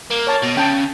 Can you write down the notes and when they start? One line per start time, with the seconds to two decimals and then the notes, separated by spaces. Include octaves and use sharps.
0.10 A#3
0.27 C#5 A5
0.42 B2
0.57 C#3 G5 A5